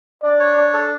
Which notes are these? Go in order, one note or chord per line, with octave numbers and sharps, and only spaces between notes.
D4 D5
C#5
D4
A4